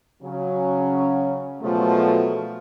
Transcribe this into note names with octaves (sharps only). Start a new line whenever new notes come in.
C#3 F#3 C#4
B2 F3 F#3 G#3 A3